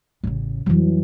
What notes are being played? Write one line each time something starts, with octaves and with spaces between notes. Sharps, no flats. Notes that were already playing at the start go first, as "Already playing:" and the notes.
A1 C#3
F2 E3 F#3 G3